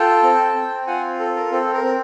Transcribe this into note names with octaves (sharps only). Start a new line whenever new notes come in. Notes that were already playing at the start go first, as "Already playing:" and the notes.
Already playing: F4 A4 G5 A5
C4
C4
F4 F#5 G#5
A4
A#4
C4 A4
A#4
C4